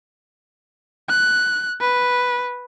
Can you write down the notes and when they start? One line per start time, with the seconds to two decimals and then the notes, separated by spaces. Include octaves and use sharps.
1.09 F#6
1.80 B4